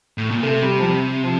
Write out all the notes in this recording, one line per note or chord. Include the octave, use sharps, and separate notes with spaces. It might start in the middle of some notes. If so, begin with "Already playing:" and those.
A2
A#2
C3 A3
G3
F3
G3
F3